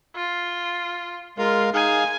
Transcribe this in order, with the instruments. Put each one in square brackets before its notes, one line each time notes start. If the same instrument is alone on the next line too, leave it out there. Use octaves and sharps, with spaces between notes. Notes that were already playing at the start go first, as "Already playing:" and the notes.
[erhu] F4
[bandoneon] G#3 A#4 F5 [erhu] F4
[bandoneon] D#4 G#4 F5 [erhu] G#5